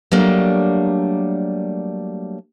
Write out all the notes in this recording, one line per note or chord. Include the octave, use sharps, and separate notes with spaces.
F#3 G3 A3 A#3 D4